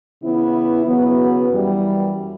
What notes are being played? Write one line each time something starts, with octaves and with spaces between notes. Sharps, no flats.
C#3 E3 B3 E4
C#3 F#3 B3 F#4 B4
F#2 E3 G3